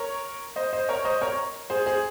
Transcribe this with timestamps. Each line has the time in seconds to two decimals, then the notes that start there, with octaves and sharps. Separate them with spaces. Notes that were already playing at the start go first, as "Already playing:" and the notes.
Already playing: A#4 C#5
0.56 C5 D#5
0.73 C5 D#5
0.89 A#4 C#5
1.05 C5 D#5
1.22 A#4 C#5
1.70 G#4 C5
1.86 G#4 C5